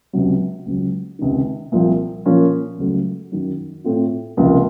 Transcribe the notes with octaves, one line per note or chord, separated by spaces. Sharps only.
C#2 C3 F#3
C#2 C#3 F#3
C#2 C3 D#3
C2 A#2 F3 C4
A#2 F3 A#3 C#4
C#2 C#3 F#3 A3
F#2 D#3 F#3
A2 A3 C4 F4
C#2 C3 F3 A#3 F4